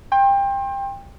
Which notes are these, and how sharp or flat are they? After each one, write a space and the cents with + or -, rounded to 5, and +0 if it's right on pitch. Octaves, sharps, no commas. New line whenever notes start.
G5 +20 C6 +35